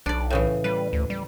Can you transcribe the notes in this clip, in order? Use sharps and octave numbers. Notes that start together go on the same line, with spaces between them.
B1 D4 D5
A2 C#3 E3
G3 B4
D2
G3